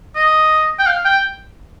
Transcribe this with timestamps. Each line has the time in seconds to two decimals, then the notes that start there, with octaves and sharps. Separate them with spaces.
0.16 D#5
0.79 G5
0.86 F5
1.05 G5